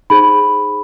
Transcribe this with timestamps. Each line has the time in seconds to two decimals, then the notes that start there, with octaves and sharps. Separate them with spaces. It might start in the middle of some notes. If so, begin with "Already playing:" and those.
0.10 D#4 G#4 C5 B5